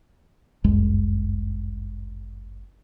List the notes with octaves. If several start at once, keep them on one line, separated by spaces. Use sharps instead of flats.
G1 C#2 F#2 G#3